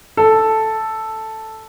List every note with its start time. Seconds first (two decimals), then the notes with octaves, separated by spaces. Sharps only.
0.17 A4